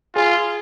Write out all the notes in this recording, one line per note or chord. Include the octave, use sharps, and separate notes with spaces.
F4 G#4